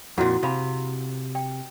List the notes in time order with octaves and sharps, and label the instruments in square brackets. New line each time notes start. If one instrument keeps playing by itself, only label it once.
[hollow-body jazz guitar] F2 A#2 [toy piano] E4 F#4 F#5
[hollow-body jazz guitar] C3 [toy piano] F5 B5
[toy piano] G5